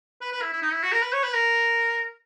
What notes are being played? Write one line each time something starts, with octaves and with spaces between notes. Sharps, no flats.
B4
B4
E4
E4
D#4
E4
F#4
A#4
B4
C#5
B4
A#4